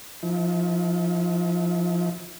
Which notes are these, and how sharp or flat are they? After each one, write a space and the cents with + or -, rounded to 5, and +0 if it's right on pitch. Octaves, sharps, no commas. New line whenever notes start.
F3 +0 E4 -45